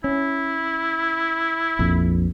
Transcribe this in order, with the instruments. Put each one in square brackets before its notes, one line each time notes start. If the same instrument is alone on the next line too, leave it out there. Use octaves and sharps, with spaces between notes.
[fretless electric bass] C#4 [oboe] E4
[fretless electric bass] A#1 F2